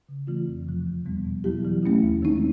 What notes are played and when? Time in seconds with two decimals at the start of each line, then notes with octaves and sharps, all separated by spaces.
0.09 C#3
0.27 E3 A3 C4 F4
0.48 F2
0.67 C3 F3
0.87 E2
1.06 B2 G3 B3
1.25 B2
1.44 F#3 B3 E4 G4
1.65 E3
1.83 A3 C#4 E4
2.02 D#2
2.22 D#3 G#3 C4 D#4